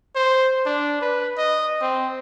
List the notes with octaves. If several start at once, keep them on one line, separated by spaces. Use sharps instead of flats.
C5
D4
B4
D#5
C4